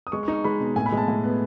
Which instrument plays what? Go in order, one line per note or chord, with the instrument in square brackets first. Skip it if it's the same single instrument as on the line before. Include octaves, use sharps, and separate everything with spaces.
[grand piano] D#6
G#3 C#6
C#6
D#4
C#6
G#3 B5
B2
A2 G#5
B5
G#3 A5
A2
B3